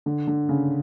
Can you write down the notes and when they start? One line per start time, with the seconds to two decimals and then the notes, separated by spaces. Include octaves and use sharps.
0.06 D3
0.27 D3
0.49 C#3